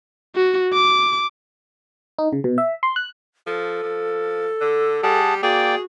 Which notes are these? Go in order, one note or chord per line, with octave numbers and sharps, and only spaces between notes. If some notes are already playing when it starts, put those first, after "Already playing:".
F#4
D6
D#4
C#3
B2
E5
C6
F#6
F3 A4
F3
D3
G3 G#4 F#5 A5
A#3 F#4 G#4 D5 G5